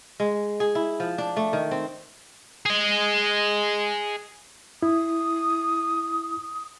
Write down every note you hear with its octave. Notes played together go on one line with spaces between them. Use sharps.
G#3
G#4
E4
F3
D4
A3
D#3
C4
G#4 D#5
E4 D#6